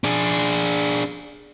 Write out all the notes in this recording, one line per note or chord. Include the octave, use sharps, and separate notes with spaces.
D4 G#4